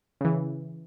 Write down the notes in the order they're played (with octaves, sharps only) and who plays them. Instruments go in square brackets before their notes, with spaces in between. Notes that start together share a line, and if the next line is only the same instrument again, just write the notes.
[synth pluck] C#3 E3